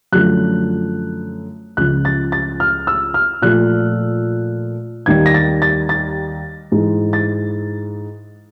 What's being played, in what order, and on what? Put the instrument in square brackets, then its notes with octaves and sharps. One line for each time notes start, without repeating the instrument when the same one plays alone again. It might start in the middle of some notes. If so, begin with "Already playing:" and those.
[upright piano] F#2 D3 F3 A3 F#6
C#2 C#3 F3 F#6
A6
A6
F6
E6
F6
A#2 F3 A3 F#6
D#2 D#3 G3 G#6
A#6
A6
A6
A6
G#2 E3 G#3
A6